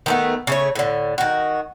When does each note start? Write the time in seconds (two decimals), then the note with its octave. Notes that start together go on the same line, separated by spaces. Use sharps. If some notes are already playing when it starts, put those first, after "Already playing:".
0.06 D#3 A3 B3
0.47 C#3 A3 C#5
0.75 A2 D3
1.18 D#3 F#4